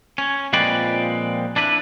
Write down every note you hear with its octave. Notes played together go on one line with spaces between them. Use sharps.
C#4
A#2 F3 G#3 C4 B4 D5
D4 E4 B4